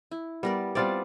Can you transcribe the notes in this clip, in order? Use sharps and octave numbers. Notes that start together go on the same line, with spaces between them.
E4
G3 B3 A#4 D5
G3 B3 C4 F4 D5 A5